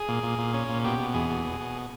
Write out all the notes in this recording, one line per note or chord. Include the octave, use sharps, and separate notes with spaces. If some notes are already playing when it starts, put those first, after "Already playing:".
Already playing: G#4
A#2
A#2
A#2
C#4
A#2
B2 G4
B2
E2 G#4
B2
B2
B2